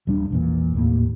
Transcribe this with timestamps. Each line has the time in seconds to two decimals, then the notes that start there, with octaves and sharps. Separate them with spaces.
0.07 D#1 G3 D4
0.30 A#1 E2 A#2
0.74 D#2 A2 A#3